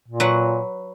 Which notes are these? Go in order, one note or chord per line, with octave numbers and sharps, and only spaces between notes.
A#2
F#3 B4 F#5